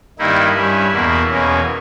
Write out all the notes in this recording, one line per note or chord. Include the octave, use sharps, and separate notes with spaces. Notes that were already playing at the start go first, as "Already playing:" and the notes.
G2 D#3 A#3 D#4 E4
G2 G3 C#4
E2 B2 A#3
E2 B2 A#3 C#4